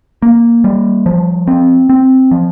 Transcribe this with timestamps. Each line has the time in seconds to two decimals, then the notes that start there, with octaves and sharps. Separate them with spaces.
0.22 A#3
0.64 G3
1.06 F3
1.47 C4
1.89 C4
2.31 F3